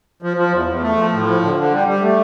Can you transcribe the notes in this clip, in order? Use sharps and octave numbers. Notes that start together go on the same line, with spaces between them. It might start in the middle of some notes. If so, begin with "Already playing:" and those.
F3
F3
E2
E2
A3
F3
A2
F3
D3
D3
G3
G3
A3